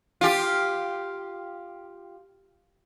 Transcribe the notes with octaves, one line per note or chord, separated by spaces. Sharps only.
F4 G4